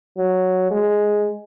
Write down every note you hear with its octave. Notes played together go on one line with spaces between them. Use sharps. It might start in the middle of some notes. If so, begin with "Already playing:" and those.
F#3
G#3